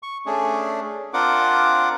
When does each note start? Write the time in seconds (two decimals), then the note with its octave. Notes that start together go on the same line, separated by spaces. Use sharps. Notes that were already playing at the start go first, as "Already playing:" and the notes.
0.03 C#6
0.26 A3 C#4 D4 G#4
1.14 C4 D4 F4 A#4 F#5 D6